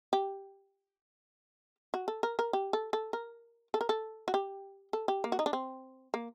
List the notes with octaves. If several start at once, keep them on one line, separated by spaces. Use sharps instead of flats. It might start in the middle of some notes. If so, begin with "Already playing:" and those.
G4
F#4
A4
A#4
A#4
G4
A4
A4
A#4
A4
A#4
A4
F#4
G4
A4
G4
A#3
F#4
D#4
D4
C4
A#3